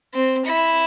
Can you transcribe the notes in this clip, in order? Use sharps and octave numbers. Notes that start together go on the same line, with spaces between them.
C4
E4